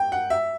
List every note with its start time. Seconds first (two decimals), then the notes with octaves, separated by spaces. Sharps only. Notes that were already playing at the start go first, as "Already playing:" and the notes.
Already playing: G5
0.12 F#5
0.30 E5